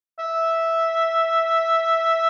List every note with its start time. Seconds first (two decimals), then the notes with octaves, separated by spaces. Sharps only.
0.19 E5